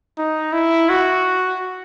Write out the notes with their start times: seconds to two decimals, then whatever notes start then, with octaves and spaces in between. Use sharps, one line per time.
0.18 D#4
0.53 E4
0.89 F#4